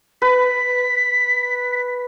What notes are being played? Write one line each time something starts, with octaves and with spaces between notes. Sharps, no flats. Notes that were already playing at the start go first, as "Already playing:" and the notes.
B4 B6